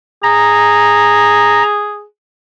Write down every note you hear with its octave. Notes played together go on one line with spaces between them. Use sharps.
G#4 A#5